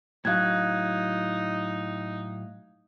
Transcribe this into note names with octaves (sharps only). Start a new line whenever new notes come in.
A2 F#3 D#4 F5 F#6 G#6